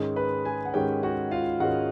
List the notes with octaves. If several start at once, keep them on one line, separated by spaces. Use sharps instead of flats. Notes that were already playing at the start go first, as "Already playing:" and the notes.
Already playing: G#2 D#3 G#3 C#4
B4 B5
G#4 G#5
F#5
G#2 D#3 G#3 C#4 G4 G5
F#4 F#5
F4 F5
G#2 D#3 G#3 C#4 F#4 F#5